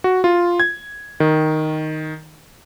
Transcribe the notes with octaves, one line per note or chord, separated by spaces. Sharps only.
F#4
F4
G#6
D#3